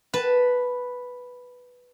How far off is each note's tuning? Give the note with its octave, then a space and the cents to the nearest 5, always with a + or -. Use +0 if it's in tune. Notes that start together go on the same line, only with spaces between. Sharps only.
B4 +0 A5 +0